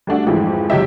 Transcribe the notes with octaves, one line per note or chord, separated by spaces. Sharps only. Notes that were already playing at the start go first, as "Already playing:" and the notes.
G3 A3 D4 F#4
F2 G#2 E3 F3
F#1 F#3 G4 D#5 E5